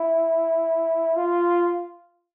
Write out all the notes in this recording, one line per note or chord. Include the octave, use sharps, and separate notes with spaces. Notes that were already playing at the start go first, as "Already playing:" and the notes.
Already playing: E4
F4